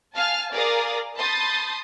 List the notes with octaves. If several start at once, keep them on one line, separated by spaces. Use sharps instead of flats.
F5 G#5 A5 F6
G#4 A#4 D5 F5 D#6
A5 B5 C6 D#6 G6 A6